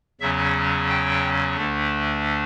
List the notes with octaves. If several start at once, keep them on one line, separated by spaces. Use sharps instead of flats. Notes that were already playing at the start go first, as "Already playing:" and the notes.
E2 C#3 F#3 C#4 E5
G5
D2 D3 A3 D4